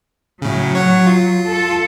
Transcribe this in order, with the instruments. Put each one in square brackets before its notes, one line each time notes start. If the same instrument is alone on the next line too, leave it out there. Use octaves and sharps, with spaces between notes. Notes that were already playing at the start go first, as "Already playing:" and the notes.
[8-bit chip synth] A2 C#3 [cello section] F#3
[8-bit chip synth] C#5 F#5
F4
[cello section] A4